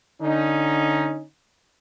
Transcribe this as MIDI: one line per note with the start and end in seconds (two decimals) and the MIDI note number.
0.21 1.24 50
0.21 1.24 61
0.21 1.24 63